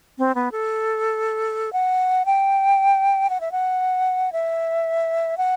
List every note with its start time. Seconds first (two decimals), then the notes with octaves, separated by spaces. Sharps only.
0.18 C4
0.35 B3
0.52 A4
1.73 F#5
2.26 G5
3.30 F#5
3.41 E5
3.52 F#5
4.33 E5
5.38 F#5